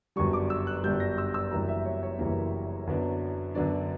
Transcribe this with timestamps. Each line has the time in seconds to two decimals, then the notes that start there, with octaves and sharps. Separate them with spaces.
0.16 G1 F#2 D3 G3 C#6
0.33 D6
0.50 E6
0.67 F#6
0.83 G1 F#2 D3 G3 G6
1.00 A#6
1.18 E6
1.34 E6
1.51 F#1 F#2 E3 G3 A#3 A#5
1.68 E5
1.85 C#5
2.02 C#5
2.19 F#1 F#2 E3 G3 A#3
2.87 F#2 D3 F#3 B3 D4
3.54 F#2 D3 F#3 B3 D4 D5